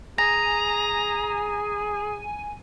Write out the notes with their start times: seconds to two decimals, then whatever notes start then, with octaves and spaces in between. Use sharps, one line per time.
0.18 G#4 G#5 A#5 A#6